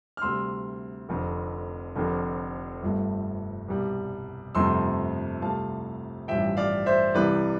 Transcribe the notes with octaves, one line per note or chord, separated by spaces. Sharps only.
F6
D2 C3 G3 C6 E6
F1 F2 D3
F1 F2 D3
G1 G2 F3 A3
C2 B2 G3
G1 F2 C3 F3 A3 C6 E6
C2 C3 F3 A3 F5 A5
A1 G2 F3 E5 G5
D5 F5
C5 E5
C2 C3 E3 G3 B4 D5